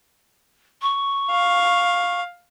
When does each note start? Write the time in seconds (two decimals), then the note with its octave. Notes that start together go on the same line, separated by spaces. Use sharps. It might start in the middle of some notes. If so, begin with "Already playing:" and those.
0.82 C#6
1.31 F5